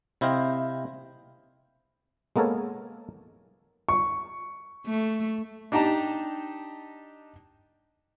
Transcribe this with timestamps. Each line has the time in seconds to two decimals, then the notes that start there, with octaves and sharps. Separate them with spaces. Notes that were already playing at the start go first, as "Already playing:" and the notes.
0.21 C3 E4 C5 D#5 F5 G5
2.36 G#3 A#3 B3 A4 A#4 C#5
3.89 C#6
4.86 A3
5.72 D4 D#4 G4 A5 A#5